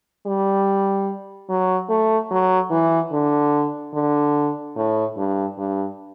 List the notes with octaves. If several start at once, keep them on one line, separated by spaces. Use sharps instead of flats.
G3
F#3
A3
F#3
E3
D3
D3
A2
G2
G2